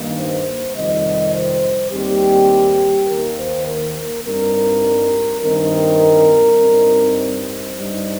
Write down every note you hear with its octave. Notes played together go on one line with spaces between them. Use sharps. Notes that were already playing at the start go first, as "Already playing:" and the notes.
Already playing: G2 D#3 A#3 D#4
C5
F2 C3 D#3 G3 D#4 D#5
C5
D#2 D#3 G3 C4 G4
D#2 D#3 A#3 A#4
C5
A#4
G2 G3 C4 D#4 A#4
G2 D#3 C4 D#4 A#4
G2 G3 C4 D#4
C5
G2 G3 D#4